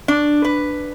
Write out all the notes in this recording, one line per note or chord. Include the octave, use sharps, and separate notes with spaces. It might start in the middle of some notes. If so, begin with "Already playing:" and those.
D4
B4